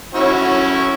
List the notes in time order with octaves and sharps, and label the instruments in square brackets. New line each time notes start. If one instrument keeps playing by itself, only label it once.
[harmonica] C#4 E4 F#4